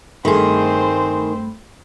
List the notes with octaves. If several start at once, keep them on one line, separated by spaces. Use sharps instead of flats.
G2 D#3 A3 C4 G#4 C5 B5